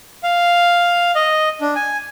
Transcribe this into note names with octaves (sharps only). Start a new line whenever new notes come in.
F5
D#5
D4
G#5